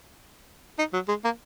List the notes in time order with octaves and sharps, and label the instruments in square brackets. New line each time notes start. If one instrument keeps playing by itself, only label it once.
[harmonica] D#4
F#3
G#3
A#3